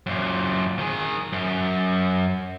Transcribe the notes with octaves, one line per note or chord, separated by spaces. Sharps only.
F#2 A#2
D#3 G#4
F#2